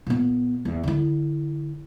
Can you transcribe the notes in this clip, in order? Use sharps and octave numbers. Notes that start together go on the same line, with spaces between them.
A#2 B3
E2
D3 E4